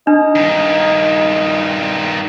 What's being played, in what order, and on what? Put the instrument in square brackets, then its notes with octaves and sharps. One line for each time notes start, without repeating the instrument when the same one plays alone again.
[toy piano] D4 [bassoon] D#4
[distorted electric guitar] G2 D#3